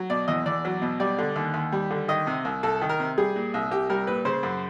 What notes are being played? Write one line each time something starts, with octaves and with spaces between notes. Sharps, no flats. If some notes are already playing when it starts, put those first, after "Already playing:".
Already playing: F#3
B2 D5
E2 D#5
E2 D5
F#3
B2
G3 D5
D3
D#2
D#2
G3
D3
D#3 D#5
C3
C2
C2 A4
D#3
A#4
C3
G3 G#4
A#2
C2
C2 G4
G3 A#4
A#2 B4
C#3 C5
F#2